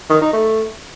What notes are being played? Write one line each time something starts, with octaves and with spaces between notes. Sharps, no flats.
D#3
D#4
A3